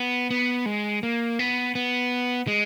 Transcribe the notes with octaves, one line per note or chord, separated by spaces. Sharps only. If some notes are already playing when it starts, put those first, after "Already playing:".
Already playing: B3
B3
G#3
A#3
B3
B3
G#3